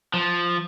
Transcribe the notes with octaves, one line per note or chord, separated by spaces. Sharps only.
F3